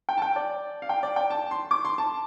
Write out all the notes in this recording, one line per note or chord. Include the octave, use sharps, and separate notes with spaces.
G5
A5
G5
D5
F5
G5
D5
G5
A5
C6
D6
C6
A5